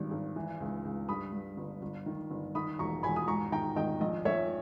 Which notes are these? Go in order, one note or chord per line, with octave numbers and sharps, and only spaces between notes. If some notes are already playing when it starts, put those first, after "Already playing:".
Already playing: G#1 G2 D#3
G#1
E3
C#2
C#2
G2 B5 D#6
G2
G1
G1
D#3
G1
D#3 B5 D#6
E1 A#5 C#6
E1 G#5 B5
D#6
G#2 A#5 C#6
D#3 G5 A#5
G#1 D#5 G5
A#1 D#5
A#1 C#5 E5